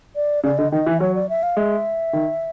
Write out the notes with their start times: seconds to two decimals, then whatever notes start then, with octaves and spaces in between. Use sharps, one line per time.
0.16 D5
0.44 C#3 D5
0.58 D3 D#5
0.72 D#3 D#5
0.86 E3 E5
1.00 F#3 C#5
1.15 D5
1.29 E5
1.43 F5
1.57 G#3 E5
2.13 D#3